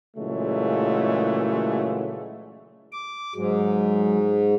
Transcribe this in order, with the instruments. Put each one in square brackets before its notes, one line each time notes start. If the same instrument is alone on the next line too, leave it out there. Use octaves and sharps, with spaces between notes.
[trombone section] A#2 C#3 E3 F#3 G#3 A3
[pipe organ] D6
[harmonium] G#2 [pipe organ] F#3 G#3